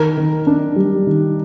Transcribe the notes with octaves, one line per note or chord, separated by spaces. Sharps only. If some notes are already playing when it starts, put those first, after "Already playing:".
Already playing: D#3 A#4
D#3
D4
G3
D#3